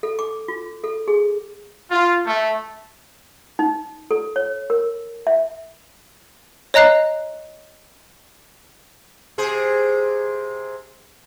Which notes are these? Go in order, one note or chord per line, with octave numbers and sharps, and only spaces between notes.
A4
D6
F4
A4
G#4
F4
A3
D#4
A4
C#5
A#4
E5
C#5 D#5 A#5 F#6 C7
C3 G#4 C5